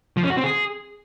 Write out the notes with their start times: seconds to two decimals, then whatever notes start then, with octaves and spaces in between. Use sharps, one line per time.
0.17 F3
0.24 C#4
0.30 F#4
0.37 C4
0.44 G#4